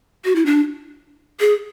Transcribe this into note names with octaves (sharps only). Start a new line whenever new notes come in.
F#4
E4
D4
G#4